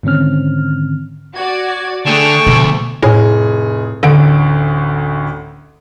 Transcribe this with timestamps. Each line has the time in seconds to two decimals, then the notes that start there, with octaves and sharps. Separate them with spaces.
0.03 G#2 D3 D#3 C4 C#4 F6
1.35 F#4 D5 G#6
2.05 D3 A3 G#4 G5 A5 C#6
2.47 D2 B2 F3
3.03 F1 A2 G#4
4.03 A1 D2 D3 D7